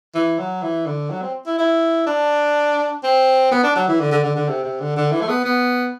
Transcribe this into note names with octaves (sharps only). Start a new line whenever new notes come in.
E3
F#3
E3
D3
F#3
C4
E4
E4
D4
C4
B3
D4
F#3
E3
D3
D3
D3
D3
C3
C3
D3
D3
E3
A3
B3
B3